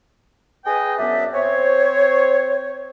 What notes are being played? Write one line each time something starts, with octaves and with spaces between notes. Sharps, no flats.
G#4 B4 D#5 G5 G#5
F#2 B3 D4 D5 E5
C4 C5 C#5